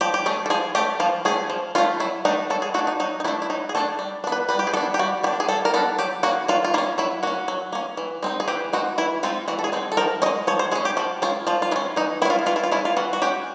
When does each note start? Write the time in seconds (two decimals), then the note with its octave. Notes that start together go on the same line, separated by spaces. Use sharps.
0.01 F3 G4
0.14 G4
0.26 A3 C#4 G#4
0.46 A4
0.50 F3 G#4
0.75 A3 C#4 G4
1.00 F3 F4
1.25 A3 C#4 G#4
1.50 F3
1.75 A3 C#4 F4
2.00 F#3 E4
2.25 A3 D4 D#4
2.50 F#3 A4
2.62 G#4
2.74 A3 F#4
2.79 D4
2.87 D#4
3.00 F#3 D#4
3.20 D#4
3.24 A3 D4 E4
3.42 E4
3.50 F#3 D#4
3.69 G#4
3.75 A3 D4 A4
3.99 G3
4.24 D4
4.27 B3
4.32 B4
4.49 G3 B4
4.59 G4
4.67 G#4
4.74 B3 D4 A4
4.94 G4
4.99 G3 F#4
5.23 B3 D4 G4
5.40 G#4
5.48 G3 A4
5.65 A#4
5.74 B3 D4 A4
5.99 F#3 G4
6.23 A#3 C#4 F#4
6.48 F#3 F4
6.65 F4
6.74 A#3 E4
6.78 C#4
6.98 F#3 E4
7.23 A#3 C#4 F#4
7.48 F#3
7.73 A#3 C#4
7.97 E3
8.23 G#3 C4 D#4
8.40 G#4
8.48 E3 G4
8.73 G#3 C4 D#4 F#4
8.98 E3 E4
9.23 G#3 C4 D#4 F4
9.48 E3 F#4
9.59 A4
9.64 G#4
9.72 G#3 C4 D#4
9.92 A4
9.97 F3 A#4
10.22 C#4 D#5
10.26 G#3
10.47 F3 C#5
10.59 C5
10.72 G#3 G#4
10.75 C#4
10.85 G4
10.97 F3 F#4
11.22 G#3 C#4 F4
11.47 F3 F4
11.62 F4
11.71 G#3 E4
11.76 C#4
11.96 E3 D#4
12.22 G#3 E4
12.25 C#4 F4
12.39 E4
12.46 E3 F4
12.56 E4
12.64 F4
12.72 G#3 C#4 E4
12.85 F4
12.97 E3 F#4
13.13 F#4
13.22 G#3 C#4 G4